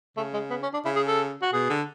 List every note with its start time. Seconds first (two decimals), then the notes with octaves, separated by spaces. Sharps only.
0.17 C#3 A3
0.34 G#3
0.50 B3
0.63 C#4
0.73 D4
0.85 C#3 E4
0.96 G#4
1.07 A4
1.42 F#4
1.53 B2 G#4
1.70 D3